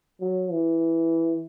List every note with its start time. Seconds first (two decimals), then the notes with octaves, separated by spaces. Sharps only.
0.21 F#3
0.51 E3